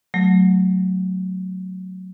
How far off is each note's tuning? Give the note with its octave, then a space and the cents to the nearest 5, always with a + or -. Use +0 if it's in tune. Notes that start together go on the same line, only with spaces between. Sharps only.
F#3 +0 A3 +0